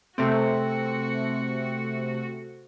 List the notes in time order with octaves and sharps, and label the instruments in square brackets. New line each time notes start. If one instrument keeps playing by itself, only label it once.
[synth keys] C3 A3 C4 [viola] F#4